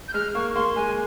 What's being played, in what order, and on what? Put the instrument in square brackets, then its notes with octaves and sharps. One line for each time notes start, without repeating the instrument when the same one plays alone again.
[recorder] G6
[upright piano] G#3 [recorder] F6
[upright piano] A#3 [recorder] C#6
[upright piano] A#3 [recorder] C6
[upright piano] G#3 [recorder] G#5